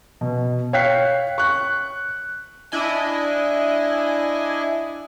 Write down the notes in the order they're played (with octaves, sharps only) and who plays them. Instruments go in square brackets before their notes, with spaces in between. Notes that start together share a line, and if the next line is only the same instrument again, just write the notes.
[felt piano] B2
C#5 F5 G5 F#6 B6 C7
C#6 F#6
[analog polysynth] D4 E4 D#5 G#5